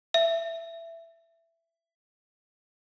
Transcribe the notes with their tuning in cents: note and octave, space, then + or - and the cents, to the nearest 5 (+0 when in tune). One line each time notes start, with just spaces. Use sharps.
E5 +15